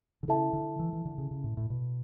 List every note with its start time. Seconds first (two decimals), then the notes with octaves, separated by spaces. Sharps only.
0.23 D3
0.28 C#3 E4 A4 E5 A5
0.53 D3
0.79 E3
0.93 E3
1.05 D3
1.18 C#3
1.31 C#3
1.44 A2
1.57 A2
1.70 B2